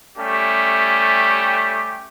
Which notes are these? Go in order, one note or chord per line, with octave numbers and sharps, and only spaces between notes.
G3 A3 C#4 G4